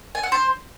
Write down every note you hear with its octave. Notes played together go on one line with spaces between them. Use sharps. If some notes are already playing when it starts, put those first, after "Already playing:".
G#5
F#5
C5